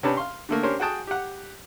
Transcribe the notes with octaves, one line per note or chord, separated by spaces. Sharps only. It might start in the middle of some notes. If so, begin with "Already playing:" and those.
C3 C#4 D4 G4 B4 A5
F5 C6
D3 A3 A#3
C#4 D4 G4 A#4 C5
F#4 G#4 F#5 G5 A5 D#6
G4 F#5